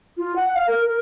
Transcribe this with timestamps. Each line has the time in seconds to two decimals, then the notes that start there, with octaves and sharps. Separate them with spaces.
0.18 F4
0.36 F#5
0.55 F5
0.68 A#4
0.86 A#4